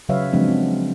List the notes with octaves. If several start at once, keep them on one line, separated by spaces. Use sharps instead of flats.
C#3 F#3 B4 C#5 E5 F5
C#3 F3 F#3 G#3 C4 D4
C4 F#4